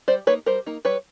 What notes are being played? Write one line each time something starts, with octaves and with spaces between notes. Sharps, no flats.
G3 C5 D5
A#3 D#4 B4 C#5
G3 A#4 C5
A#3 D#4
G3 B4 C#5